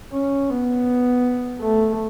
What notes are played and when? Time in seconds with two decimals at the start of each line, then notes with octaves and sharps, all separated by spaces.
0.12 C#4
0.50 B3
1.61 A3